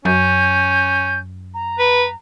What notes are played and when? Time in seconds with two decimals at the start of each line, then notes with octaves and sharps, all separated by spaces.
0.05 F#2 C#4 G6
1.54 A#5
1.79 B4